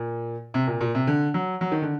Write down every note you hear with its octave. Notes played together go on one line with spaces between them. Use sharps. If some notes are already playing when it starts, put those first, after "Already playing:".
Already playing: A#2
C3
A#2
A#2
C3
D3
F#3
F#3
D#3
D3